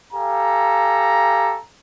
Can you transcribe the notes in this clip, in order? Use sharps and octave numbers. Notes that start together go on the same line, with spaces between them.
G4 A4 F5 G#5 A#5